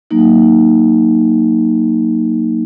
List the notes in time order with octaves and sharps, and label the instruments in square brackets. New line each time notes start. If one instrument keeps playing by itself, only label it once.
[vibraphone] F#3 A#3 D#4